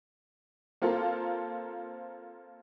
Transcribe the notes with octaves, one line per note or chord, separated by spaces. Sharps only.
A#3 C4 F4 A4 A#4